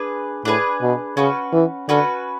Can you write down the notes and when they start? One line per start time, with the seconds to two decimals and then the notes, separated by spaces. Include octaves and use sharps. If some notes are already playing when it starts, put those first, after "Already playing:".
Already playing: D4 G#4 B4
0.45 A2 D4 G#4 B4
0.82 B2
1.17 C#3 C#4 F#4 B4
1.53 E3
1.89 D3 C#4 F#4 B4